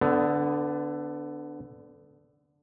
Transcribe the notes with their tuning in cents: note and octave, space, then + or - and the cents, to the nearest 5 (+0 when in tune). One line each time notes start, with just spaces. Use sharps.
D3 +0 B3 +25